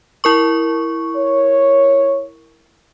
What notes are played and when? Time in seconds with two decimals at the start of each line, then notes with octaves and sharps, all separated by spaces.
0.24 E4 A#4 C#6
1.15 C#5